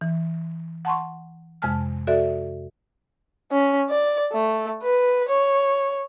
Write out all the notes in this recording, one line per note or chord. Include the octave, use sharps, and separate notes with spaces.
E3
F#5 A5 C6 C#6
F2 C3 G#3 G#5 A5 F6
F#4 A4 D5 E5
C#4
D5
A3
B4
C#5